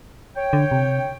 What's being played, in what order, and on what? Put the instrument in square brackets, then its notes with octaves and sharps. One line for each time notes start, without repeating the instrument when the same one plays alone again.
[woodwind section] C#5 G5
[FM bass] D3
C3